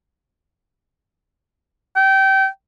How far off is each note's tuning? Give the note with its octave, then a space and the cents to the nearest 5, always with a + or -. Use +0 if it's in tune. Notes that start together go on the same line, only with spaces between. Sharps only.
G5 -25